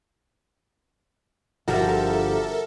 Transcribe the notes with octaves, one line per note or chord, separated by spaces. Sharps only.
G1 D3 F3 G3 F#4 A4 A#4 E5